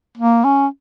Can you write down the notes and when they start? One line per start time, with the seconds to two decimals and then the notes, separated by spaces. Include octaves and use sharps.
0.18 A#3
0.44 C#4